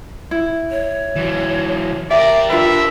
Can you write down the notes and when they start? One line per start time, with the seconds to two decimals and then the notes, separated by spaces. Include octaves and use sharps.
0.31 E4
0.70 C#5
1.16 E3 F#3
2.11 G4 A#4 D5 E5
2.50 D4 F4 B4 E5